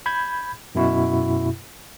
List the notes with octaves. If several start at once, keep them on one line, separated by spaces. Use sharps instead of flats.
B5 G6 G#6
F#2 B2 E4 F#4